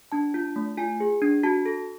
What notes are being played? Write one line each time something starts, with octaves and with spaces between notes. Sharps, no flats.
D4 A5
F4
A3
F4 G#5
G#4
D4
F#4 A5
A4